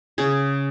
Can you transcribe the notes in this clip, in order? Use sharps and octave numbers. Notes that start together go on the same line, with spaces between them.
C#3 G#4